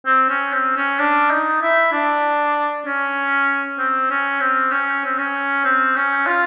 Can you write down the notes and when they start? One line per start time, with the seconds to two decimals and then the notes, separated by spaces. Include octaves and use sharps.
0.06 C4
0.30 C#4
0.53 C4
0.77 C#4
1.00 D4
1.31 D#4
1.62 E4
1.92 D4
2.86 C#4
3.79 C4
4.11 C#4
4.41 C4
4.72 C#4
5.05 C4
5.18 C#4
5.65 C4
5.96 C#4
6.27 F4